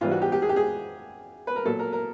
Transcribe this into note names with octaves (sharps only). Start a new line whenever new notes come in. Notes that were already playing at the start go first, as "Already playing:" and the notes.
G#2 E3 G3 F4
F#4
G4
G4
G#4
G4
G#4
B4
A#4
A#2 F#3 A4
A#4
A#4